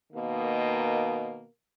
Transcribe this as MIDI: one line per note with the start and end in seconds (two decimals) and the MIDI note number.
0.13 1.45 47
0.13 1.45 51
0.13 1.45 58